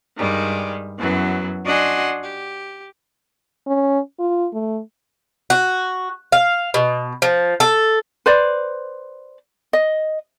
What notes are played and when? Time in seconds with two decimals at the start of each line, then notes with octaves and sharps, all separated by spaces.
0.18 G2 D#3 G3 G#3
0.98 F#2 E3 F#3 B3
1.65 D4 F#4 D#5 F#5 G#5 C6
2.22 G4
3.67 C#4
4.20 F4
4.53 A3
5.50 F#4
6.32 F5
6.74 B2
7.22 F3
7.60 A4
8.26 B4 C5 D5
9.73 D#5